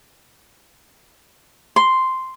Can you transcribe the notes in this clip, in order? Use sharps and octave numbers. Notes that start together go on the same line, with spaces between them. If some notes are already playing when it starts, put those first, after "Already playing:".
C6